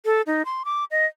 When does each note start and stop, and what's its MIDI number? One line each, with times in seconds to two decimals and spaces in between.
0.05 0.22 69
0.27 0.42 63
0.45 0.63 84
0.65 0.84 86
0.91 1.06 75